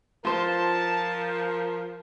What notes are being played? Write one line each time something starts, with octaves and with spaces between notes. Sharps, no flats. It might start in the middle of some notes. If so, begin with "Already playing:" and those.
F3 F4 A#4 C5 A5